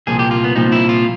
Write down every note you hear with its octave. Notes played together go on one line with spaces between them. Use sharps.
C2 A#2 F3 G#4
G4
F4
B3
C2 A#2 F3 D#4
E4
F4